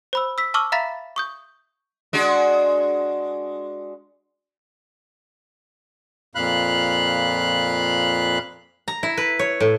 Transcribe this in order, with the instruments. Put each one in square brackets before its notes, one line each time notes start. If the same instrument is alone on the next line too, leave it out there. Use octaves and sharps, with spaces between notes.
[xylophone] C5 B5 E6
E6 B6
A5 C#6 D6 E6 F6 F#7
E5 F5 A#5 B5 A6 B6
C#6 D#6 G6
[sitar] G#3 D4 F#4
[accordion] F2 A#2 F5 B5 F#6
[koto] A#5
E4
B4
C#5
A2